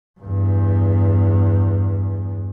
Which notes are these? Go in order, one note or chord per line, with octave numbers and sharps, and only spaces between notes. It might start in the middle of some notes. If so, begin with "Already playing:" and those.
E2 G2